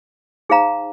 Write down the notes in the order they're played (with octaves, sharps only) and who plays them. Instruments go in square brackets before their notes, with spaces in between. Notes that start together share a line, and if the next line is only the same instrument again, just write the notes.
[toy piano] D#4 G#4 C5 F5 A#5